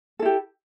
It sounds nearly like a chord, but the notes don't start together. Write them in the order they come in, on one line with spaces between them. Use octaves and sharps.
A4 E4 G4